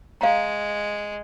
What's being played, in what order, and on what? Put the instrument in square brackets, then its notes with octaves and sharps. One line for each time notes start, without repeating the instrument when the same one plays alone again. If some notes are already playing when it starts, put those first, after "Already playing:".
[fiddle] G#3 [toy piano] F5 A#5